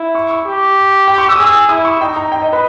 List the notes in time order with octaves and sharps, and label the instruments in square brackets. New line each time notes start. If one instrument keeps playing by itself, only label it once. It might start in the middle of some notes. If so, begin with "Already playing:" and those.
Already playing: [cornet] E4
[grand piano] C#6
C#6
[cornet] G4
[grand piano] G5
C#6
E6
D#6
[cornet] G#4
[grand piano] E6
[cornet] E4 [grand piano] D#6
[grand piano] C#6
[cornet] D#4 [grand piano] G5
[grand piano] A#5
G5
D#5
B4